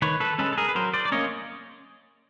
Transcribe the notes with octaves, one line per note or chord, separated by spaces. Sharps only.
D#3 B4 C#5
A4 B4
G#3 C#4 A4 B4
A4
G#4 A#4
B4
F#3 A#4 C5
C5 D5
D5
A#3 C#4 C#5 D#5